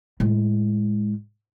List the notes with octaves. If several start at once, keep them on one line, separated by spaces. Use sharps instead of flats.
A2 G#3